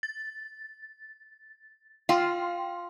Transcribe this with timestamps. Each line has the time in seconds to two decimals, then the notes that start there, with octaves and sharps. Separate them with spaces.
0.03 A6
2.09 F4 F5 G5 C6